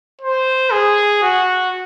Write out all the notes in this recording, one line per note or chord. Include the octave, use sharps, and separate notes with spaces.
C5
G#4
F#4